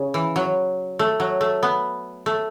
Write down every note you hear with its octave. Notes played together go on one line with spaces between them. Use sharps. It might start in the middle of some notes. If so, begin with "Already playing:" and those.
Already playing: C#3
E3
F#3
A3
F#3
A3
B3
A3